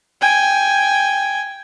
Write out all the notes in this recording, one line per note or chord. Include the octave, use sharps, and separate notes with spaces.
G5 G#5